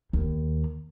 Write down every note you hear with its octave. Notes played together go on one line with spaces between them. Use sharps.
D#2